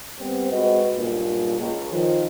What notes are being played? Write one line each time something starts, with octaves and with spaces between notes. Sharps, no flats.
G3 B3 C4
G#3 C4 F#4 B4 D#5
B1 G2 A#2
C#2
D#3 F3